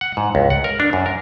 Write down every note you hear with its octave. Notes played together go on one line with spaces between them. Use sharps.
F#5
G#2
C#2
F#5
A#4
D4
F#2
A#4